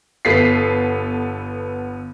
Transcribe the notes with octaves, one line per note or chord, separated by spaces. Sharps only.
G1 B3 A4 B6 C7